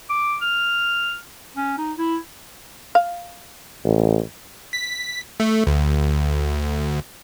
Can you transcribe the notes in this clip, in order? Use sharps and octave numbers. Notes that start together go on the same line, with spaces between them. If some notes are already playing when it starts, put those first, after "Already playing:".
D6
F6
C#4
D#4
E4
F5
A1
B6
A3
D2